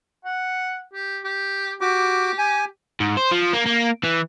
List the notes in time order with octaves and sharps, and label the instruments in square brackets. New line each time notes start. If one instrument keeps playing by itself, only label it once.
[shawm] F#5
G4
G4
[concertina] F#4 D6 [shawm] G4
[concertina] G#5
[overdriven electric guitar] G#2
C5
F3
A#3
A#3
E3